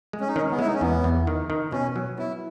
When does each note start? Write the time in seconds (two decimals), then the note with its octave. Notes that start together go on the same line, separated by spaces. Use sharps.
0.13 G#3
0.20 C#4
0.28 D#4
0.36 D#3 C#4
0.51 B3
0.59 G#3 E4
0.67 D#4
0.74 C#4
0.81 E2 B3
1.04 E2
1.27 D#3
1.50 D#3
1.72 B2 C#4
1.96 F#3
2.18 B3 E4